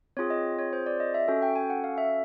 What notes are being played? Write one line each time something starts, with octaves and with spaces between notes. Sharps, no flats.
C4 F4 G#4 C#5
D#5
C#5
C5
D5
D#5
E5
C#4 F#4 A4
G5
G#5
F#5
F5
E5